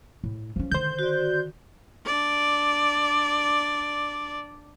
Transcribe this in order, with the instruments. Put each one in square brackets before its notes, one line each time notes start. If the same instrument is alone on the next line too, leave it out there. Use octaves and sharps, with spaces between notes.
[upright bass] A2
F3 C#4
[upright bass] D3 D#3 [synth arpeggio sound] C5 G6
[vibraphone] F#4 D5
[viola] D4 D5